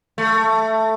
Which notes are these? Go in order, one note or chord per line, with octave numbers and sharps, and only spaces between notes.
A3